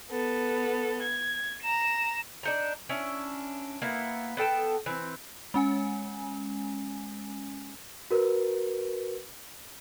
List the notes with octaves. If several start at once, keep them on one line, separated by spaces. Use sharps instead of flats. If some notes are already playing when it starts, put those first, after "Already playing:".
B3 A4
G#6
A#5 E7
D4 D#4 A#5
C#4 D4 E4
A#3 B3 E4
B3 A4 G5 A5
E3 C4
G#3 C#4 G#5
F#4 A#4 B4